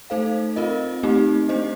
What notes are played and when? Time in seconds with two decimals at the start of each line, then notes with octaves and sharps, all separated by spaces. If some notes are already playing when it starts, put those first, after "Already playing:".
0.10 A3 D#4 A4 C5 F5
0.56 C4 F4 A#4 D#5
1.03 A3 C4 D#4 G4
1.49 A3 D4 G4 C5 D#5